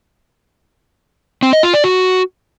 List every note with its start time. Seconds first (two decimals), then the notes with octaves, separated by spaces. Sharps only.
1.43 C4
1.53 D#5
1.63 F4
1.74 D5
1.84 F#4